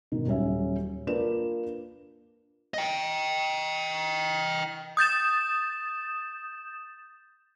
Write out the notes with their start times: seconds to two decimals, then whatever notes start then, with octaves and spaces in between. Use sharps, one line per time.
0.12 G#2 B2 D#3
0.26 D#1 F#3 C#4 E5
1.07 A#3 D4 F4 B4 D5 E7
2.74 D#5 G5
4.97 D#6 G6 A6 E7